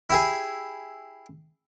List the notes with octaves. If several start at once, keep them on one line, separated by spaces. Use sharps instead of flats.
E4 G4 G#4